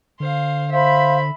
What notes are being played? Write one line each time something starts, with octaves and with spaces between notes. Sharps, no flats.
D3 C5 F5
C5 E5 F5 B5